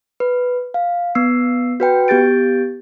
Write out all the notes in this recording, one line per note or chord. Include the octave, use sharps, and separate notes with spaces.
B4
F5
B3 E6 C7
F#4 B4 G5
B3 G4 G6 A6 D7